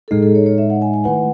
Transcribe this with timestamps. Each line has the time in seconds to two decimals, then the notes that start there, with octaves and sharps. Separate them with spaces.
0.08 A4
0.11 A2 G#3 D#4 G#4
0.23 A4
0.35 C#5
0.46 C#5
0.58 E5
0.70 F#5
0.82 G#5
0.94 G#5
1.04 D#3 A3 E4 B4 F#5